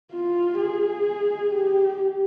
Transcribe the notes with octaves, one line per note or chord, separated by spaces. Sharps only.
F4
G#4
G4